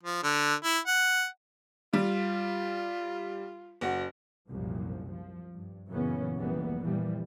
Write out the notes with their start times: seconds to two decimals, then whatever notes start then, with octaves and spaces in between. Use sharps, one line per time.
0.03 F3
0.23 D3
0.63 E4
0.87 F#5
1.94 G3 F4
3.81 F#1 F#4
4.48 C2 F#2 A#2 F3
5.10 F3
5.54 G2
5.90 F#2 A#2 C#3 E3 B3 C#4
6.37 F1 C#2 E3 G3 A#3 B3
6.81 A#2 E3 F3 G3